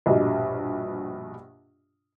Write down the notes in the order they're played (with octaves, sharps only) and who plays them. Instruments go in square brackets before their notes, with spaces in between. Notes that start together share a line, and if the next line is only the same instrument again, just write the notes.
[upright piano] A#1 G2 B2 G4 D#5